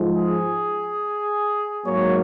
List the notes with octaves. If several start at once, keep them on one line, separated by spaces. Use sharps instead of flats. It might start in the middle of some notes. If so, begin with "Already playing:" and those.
Already playing: G#2 F3 G#3
G#4
G#2 F#3 A#3 C#5